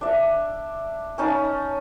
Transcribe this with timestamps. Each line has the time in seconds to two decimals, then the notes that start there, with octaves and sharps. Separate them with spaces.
0.01 D4 E5
1.18 C#4 D#4 A5